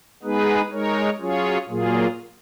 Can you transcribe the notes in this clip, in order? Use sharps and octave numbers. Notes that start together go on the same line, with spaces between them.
G#3 B3 D#4 G#4 B4
G#3 D#4 A#4 C#5
F#3 C#4 F4 G#4 C#5
A#2 F#3 A#3 F4 G#4